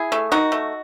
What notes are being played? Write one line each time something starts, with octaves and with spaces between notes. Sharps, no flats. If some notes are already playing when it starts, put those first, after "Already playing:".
Already playing: E4 G#4
A3
D#3 D#4 F#4
A3